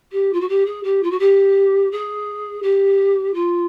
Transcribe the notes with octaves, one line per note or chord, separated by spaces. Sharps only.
G4
F4
F#4
G4
G#4
G4
F4
F#4
G4
G#4
G4
F4